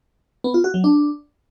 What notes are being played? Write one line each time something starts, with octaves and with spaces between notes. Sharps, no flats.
B3
F4
F#4
F#3
D4